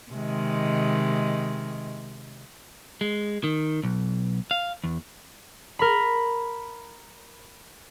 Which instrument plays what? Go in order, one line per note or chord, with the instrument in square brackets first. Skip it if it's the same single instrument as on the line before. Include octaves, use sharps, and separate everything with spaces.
[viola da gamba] C3 D#3 G#3
[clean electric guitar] G#3
D#3
B1
F5
E2
[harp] A#4 B5